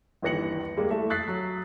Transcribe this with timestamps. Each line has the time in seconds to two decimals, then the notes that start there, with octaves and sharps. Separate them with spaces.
0.22 G1 D#2 E3 A#6 C#7 F#7
0.77 G3 G#3 A#3
0.90 A3 E4 A4 E5
1.10 C#6 D#6 F#6 A6 B6 C7
1.28 F#3